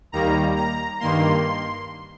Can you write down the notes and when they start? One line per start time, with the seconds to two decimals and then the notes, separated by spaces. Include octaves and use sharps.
0.12 D#2 D#3 G3 A#3 A#5
0.56 A#5
1.00 G2 D#3 A#3 C6